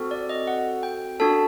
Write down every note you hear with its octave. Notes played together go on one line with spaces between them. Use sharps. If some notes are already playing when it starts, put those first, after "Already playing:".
Already playing: C4 F#4 A4
D5
D#5
F#5
G5
D4 F#4 A4 A5